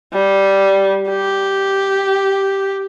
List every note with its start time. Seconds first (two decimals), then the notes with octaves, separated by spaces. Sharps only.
0.13 G3
1.10 G4